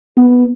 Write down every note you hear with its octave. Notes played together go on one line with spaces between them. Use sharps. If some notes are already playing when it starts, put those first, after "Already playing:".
B3